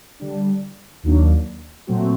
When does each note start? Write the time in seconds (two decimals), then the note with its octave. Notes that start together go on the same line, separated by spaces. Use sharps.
0.20 D3 G3 D4
1.03 D#2 D#3 F#3 A#3 D4
1.87 A#2 F#3 A3 C4 F#4